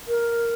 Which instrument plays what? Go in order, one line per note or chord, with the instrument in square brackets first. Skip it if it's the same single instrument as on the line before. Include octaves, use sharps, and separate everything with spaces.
[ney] A#4